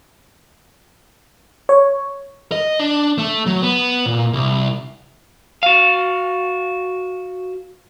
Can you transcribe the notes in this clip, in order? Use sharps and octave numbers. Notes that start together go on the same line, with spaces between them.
C#5
D#5
D4
A3
F#3
B3
A#2
C2
F#4 F5